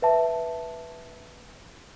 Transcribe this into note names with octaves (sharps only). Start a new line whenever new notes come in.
B4 E5 A5